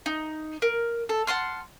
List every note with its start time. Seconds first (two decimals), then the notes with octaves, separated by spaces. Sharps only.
0.06 D#4
0.62 A#4
1.09 A4
1.27 F#5 A5 C6 F6